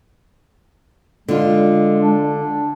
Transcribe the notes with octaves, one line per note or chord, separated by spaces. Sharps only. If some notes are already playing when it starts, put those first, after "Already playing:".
D3 G#3 F4
D4